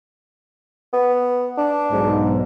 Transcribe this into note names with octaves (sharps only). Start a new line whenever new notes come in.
B3
D4
B1 G#2